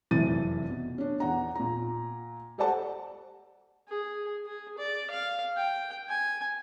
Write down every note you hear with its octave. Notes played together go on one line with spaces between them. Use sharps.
F1 F#2 C3 E3 A6 D#7
B2
C#4 D4
E2 F#5 A#5
A#2 A#5
G4 A4 C5 D5 F#5 A5
G#4
G#4
D5
F5
G5
G#5